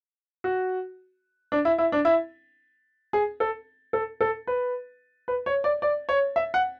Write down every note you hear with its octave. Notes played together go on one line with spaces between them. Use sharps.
F#4
D4
E4
E4
D4
E4
G#4
A4
A4
A4
B4
B4
C#5
D5
D5
C#5
E5
F#5